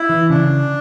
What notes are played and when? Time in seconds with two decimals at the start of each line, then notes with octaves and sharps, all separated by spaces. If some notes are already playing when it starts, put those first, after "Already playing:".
Already playing: E4
0.09 E3
0.30 C#3 D4